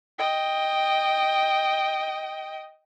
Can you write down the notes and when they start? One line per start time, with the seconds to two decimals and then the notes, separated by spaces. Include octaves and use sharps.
0.19 D#5 G5